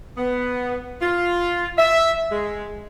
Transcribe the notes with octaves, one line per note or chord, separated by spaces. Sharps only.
B3
F4
E5
G#3